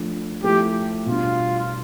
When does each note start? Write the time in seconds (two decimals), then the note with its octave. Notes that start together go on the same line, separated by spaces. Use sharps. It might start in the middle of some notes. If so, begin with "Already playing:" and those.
Already playing: F3 A3 D4
0.43 F3 A3 E4 G4
1.06 B2 G3 D4 F4